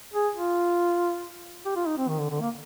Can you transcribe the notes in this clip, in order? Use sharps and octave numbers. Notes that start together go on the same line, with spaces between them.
G#4
F4
G4
F4
D#4
C4
D#3
D3
D3
A#3